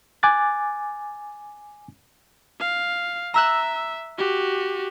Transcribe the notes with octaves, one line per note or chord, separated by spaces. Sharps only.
G#5 D6 F#6 A6
F5
E5 A#5 E6 F#6
F#4 G4